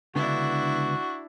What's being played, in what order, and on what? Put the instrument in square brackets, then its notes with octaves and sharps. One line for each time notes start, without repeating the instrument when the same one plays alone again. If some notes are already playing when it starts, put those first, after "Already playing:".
[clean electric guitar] C#2 D3 B3 [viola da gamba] D4 E4 [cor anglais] F#4